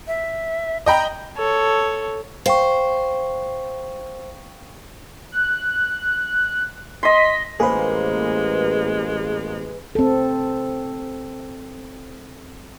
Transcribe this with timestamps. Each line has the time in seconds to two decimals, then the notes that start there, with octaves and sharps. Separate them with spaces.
0.07 E5
0.86 D#5 G5 A#5 B5
1.37 A4 C#5
2.46 C5 F5 G5 C#6
5.32 F#6
7.03 D#5 C6 B6
7.60 A1 G#3 A#3 G#4 B4 C5
9.95 C4 A4